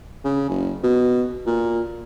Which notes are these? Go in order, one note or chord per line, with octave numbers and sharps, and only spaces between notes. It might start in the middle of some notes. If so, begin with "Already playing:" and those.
C#3
F#1
B2
A#2